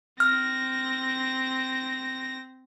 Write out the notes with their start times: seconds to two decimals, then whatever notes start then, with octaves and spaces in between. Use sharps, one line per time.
0.20 C4 F6 A#6